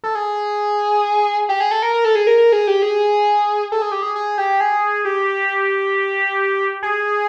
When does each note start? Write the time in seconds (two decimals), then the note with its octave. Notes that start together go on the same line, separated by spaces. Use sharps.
0.04 A4
0.15 G#4
1.49 G4
1.60 G#4
1.71 A4
1.82 A#4
1.94 A#4
2.05 A4
2.15 G#4
2.27 A#4
2.38 A#4
2.52 G#4
2.67 G4
2.82 G#4
3.72 A4
3.82 G#4
3.92 G4
4.02 G#4
4.16 G#4
4.38 G4
4.60 G#4
5.05 G4
6.83 G#4